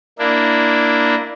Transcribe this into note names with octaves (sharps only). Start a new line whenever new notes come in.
A#3 D4 E4